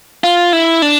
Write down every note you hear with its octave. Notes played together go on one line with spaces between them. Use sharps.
F4
E4
D4